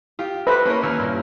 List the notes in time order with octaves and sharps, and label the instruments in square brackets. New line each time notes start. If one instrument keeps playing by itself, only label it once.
[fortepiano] F4 [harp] G4
[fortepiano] A4 C5 [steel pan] B4 [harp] E5 D6
[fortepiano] A#3 A#4 [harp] C#4 E4 C#5
[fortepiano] D#2 [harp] C#5 E6 F6
[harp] G2 [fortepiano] A#2